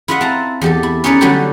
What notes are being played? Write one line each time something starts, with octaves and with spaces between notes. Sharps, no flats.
E4 F4 B4 D#5 E5 F#5
C4 A5 A#5
E2 G4 A4
E4
C#4 D#4 A4 B4 C#5 D5
D3 F#3 G3 A3 E4 G4